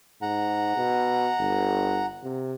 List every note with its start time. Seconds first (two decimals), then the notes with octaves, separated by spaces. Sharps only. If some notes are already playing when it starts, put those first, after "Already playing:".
0.22 G#2 F#5 A#5
0.77 B2
1.40 G1
2.24 C3